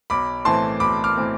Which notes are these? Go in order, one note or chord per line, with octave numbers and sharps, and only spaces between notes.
B1 B5 D6
A2 E3 A3 C4 A5 C6
B1 B5 D6
D6 F6
A2 E3 A3 C4